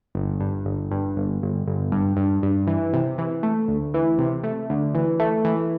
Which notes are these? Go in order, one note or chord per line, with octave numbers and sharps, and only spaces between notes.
G1
G2
G1
G2
G1
G1
G1
G2
G2
G2
E3
C3
E3
A3
D2
E3
C3
A3
D2
E3
A3
E3